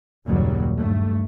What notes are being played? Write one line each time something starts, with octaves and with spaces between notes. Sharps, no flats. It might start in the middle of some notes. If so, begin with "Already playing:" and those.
F#1 D#2 A#2 F#3 G3
G2 A3